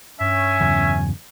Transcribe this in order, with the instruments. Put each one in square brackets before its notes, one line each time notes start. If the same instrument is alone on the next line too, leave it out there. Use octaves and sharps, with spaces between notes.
[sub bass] G2 [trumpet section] C#4 G#5 [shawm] E5
[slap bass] E2 C#3 F#3